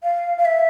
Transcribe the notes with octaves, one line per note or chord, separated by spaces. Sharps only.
F5
F5
E5